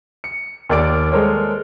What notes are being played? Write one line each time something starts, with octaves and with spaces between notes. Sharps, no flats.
C#7
D#2 A#4 D5 D6 D7
G#3 A4 A#4 C5 C#5